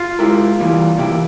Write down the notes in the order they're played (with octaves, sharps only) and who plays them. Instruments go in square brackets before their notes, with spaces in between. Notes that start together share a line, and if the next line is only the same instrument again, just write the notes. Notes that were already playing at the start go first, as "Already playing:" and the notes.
Already playing: [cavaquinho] F4
[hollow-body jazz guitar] G#3 E4 G4 A#4
E3 G3 A#3
C3 E3 A#3 E4 G4